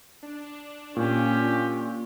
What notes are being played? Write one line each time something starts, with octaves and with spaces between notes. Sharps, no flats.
D4
A#2 C#4 G4